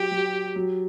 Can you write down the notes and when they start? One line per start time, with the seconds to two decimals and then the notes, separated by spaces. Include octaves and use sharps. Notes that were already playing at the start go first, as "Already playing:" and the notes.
Already playing: F#3 G4
0.11 F#3
0.56 F#3